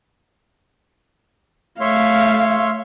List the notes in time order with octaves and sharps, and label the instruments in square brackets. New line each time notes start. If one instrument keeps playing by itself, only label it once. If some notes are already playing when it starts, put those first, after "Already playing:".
[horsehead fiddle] A3 F5 [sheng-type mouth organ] C#5 E5 C6